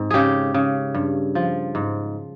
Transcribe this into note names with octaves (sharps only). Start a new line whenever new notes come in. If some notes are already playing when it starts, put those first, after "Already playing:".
Already playing: G#2 C4
C#3 G4 G#4
C#3
G2
F3
G#2